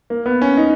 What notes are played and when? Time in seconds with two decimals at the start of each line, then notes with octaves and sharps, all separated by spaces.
0.10 A#3
0.26 B3
0.42 C#4
0.57 D#4